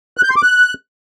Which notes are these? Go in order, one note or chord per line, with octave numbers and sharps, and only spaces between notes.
F#6
G6
C6
D6
F#6